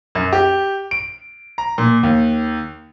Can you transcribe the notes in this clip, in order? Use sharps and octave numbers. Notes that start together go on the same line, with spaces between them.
F#2
G4
D7
A#5
A#2
D#2